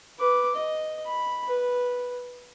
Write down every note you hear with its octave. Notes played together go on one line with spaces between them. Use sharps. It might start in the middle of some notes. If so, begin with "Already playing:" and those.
B4 D6
D#5
B5
B4